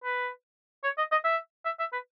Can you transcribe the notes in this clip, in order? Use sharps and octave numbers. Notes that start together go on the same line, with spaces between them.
B4
C#5
D#5
D#5
E5
E5
E5
B4